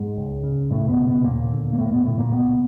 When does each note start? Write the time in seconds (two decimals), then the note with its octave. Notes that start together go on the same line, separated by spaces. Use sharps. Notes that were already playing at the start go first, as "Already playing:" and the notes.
Already playing: G#2 G#3
0.17 C#2
0.43 C#3
0.70 C#2 A2 A3
0.88 B2 B3
0.98 C#3
1.07 B2 B3
1.24 D#2 A#2 A#3
1.51 D3
1.73 A#3
1.78 D#2 A2 A3
1.86 A#3
1.92 B2 B3
2.04 A2 D3 A3
2.18 A#2 A#3
2.31 C#2 B2 B3